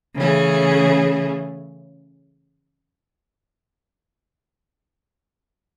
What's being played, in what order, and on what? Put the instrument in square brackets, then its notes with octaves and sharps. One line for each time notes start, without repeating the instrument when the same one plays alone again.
[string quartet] C#3 E3 A3 C#4 G#4